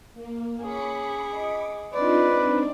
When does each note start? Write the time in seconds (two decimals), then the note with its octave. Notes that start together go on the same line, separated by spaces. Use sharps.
0.14 A#3
0.63 C#4 G#4 B5 D6 C#7
1.32 D#5
1.94 G#3 C4 D4 D#4 F4 B4 D5